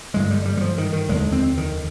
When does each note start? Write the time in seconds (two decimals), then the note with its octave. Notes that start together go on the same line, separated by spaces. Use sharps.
0.14 G#1 G2 D3 G#3
0.31 G3
0.45 G3
0.57 G3
0.61 F3
0.78 D#3
0.93 D#3
1.09 F1 D#2 D3 G#3
1.32 C4
1.57 D#3